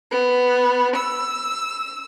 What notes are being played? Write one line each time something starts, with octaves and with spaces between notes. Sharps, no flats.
B3
E6